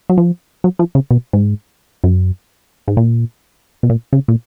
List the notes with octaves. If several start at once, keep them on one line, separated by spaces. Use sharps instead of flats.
F#3
F3
F#3
F3
C#3
B2
G#2
F#2
G#2
A#2
B2
A#2
C#3
A#2